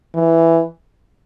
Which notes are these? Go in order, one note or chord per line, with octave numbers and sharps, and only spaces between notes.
E3